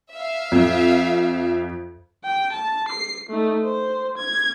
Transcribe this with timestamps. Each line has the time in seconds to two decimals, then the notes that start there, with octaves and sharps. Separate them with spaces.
0.12 E5 F5
0.52 F2
2.24 G5
2.53 A5
2.88 C7
3.29 A3 D#4
3.64 C5
4.18 G#6